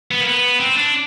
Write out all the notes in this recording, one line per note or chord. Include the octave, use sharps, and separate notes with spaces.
B3
A#3
B3
C4
D4